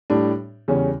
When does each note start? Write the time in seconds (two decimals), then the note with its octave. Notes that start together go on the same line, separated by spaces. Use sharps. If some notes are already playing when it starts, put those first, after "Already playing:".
0.10 A2 G3 D4
0.68 E2 C#3 G3 C#4